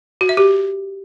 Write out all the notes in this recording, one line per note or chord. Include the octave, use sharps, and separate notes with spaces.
F#4
E5
G4